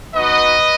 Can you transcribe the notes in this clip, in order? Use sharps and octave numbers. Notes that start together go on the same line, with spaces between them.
B3 D#4 F#4 B4 D#5